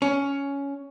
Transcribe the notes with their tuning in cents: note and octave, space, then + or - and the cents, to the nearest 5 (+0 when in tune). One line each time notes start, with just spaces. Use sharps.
C#4 +10